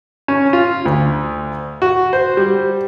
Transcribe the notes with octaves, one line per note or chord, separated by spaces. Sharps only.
C#4
F4
D2
F#4
C5
G3